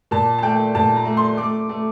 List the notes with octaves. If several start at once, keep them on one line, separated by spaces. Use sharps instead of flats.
A#2 A5
A5
A3 G5
A#2 A5
A#5
A3
C6
A3 D6
A3